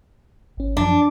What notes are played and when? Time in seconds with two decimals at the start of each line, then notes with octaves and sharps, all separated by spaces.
0.57 G#1 C#4
0.77 F#2 F3 D4